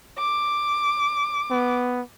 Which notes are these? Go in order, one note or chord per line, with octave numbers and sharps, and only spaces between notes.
D6
B3